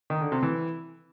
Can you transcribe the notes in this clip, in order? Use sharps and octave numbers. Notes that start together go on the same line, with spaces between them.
D#3
D3
C3
E3